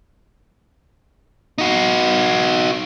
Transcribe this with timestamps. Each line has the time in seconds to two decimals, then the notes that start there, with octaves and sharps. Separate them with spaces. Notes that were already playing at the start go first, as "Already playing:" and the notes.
1.58 D#4 F#4